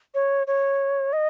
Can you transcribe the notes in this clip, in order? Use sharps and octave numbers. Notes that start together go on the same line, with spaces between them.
C#5
C#5
D#5